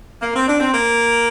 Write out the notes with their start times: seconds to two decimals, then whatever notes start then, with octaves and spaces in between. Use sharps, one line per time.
0.22 A#3
0.35 C4
0.48 D4
0.60 C4
0.72 A#3